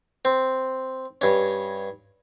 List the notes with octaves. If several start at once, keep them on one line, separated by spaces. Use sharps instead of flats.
C4
G2 C#4